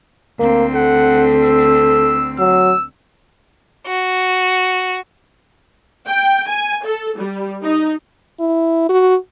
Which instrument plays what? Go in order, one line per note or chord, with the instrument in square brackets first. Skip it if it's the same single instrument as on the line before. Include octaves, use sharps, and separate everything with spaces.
[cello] D2 C4 [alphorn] A#3
[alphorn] A4 [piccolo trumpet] F#5
[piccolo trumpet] E6
[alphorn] F#3 [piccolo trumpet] E6
[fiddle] F#4
[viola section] G5
G#5
A4
G3
D#4
[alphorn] E4
F#4